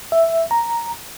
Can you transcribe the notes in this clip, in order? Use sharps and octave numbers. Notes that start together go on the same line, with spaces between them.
E5
A#5